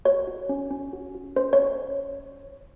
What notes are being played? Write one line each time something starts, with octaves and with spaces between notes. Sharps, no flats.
F#4 C#5
F#4
C#4
C#4
F#4
F#4
C#4 C5
C#5
C#4